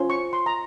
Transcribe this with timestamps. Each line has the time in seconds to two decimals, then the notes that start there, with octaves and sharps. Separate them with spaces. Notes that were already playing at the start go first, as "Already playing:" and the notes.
Already playing: C#4 F4 C5
0.10 C#6
0.33 C6
0.46 A#5